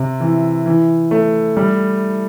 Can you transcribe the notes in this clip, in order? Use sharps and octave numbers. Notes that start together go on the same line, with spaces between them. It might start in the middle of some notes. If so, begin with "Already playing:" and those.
Already playing: C3
E3
E3
A3
G3